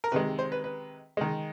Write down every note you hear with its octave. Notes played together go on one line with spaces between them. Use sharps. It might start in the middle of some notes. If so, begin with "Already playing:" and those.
A#4
C3 D#3 G#3 B4
C5
B4
B4
D#3 G#3